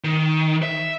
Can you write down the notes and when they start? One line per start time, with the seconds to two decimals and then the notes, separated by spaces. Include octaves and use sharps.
0.04 D#3
0.63 E5